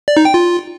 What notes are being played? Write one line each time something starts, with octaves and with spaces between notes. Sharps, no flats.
D5
D#4
G5
F4